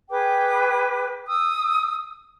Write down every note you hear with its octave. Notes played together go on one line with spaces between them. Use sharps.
G#4 B4 G5 D6
D#6 E6